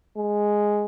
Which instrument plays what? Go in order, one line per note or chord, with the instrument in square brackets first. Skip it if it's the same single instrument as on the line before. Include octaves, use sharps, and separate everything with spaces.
[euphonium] G#3